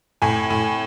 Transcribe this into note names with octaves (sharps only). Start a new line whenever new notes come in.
A2 G#5
A2